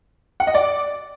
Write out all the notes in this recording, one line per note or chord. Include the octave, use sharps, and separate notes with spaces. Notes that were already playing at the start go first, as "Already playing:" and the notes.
F#5
D#5
D5